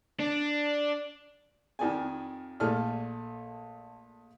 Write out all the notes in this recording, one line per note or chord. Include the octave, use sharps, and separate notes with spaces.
D4
F2 D#3 D5 G#5
A#1 A3 G#4 A4 D5 F6